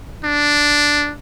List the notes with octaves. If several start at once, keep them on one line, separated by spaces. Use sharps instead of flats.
D4